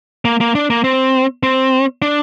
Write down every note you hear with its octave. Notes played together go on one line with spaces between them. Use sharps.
A#3
A#3
D4
A#3
C4
C4
D4